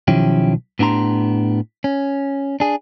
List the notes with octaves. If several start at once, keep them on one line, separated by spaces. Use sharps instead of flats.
B1 D#3 F3 C#4 E4 G4
A2 B3 D4 G4 A#5 C6
C#4
D4 G#4